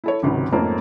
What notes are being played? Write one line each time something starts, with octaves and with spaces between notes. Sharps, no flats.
E4 A4 C#5
G#1 C#2 C3 D#3 F#3
F2 G#2 A3 A#3 C#4